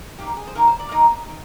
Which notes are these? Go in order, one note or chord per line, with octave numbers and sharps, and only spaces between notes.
D#3 A#3 D#4 G4
G#4
C5
D#3 A#3 D#4 A#4
C5
D5
D#3 A#3 D#4 D#5
D#3